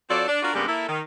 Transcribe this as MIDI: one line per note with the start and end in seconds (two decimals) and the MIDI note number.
0.10 0.23 54
0.10 0.23 60
0.10 0.23 65
0.10 0.23 69
0.10 0.23 74
0.28 0.41 62
0.43 0.53 62
0.43 0.53 65
0.43 0.53 66
0.43 0.53 70
0.54 0.65 44
0.54 0.65 49
0.54 0.65 55
0.54 0.65 58
0.54 0.65 59
0.54 0.65 62
0.67 0.85 58
0.67 0.85 64
0.67 0.85 69
0.88 1.00 51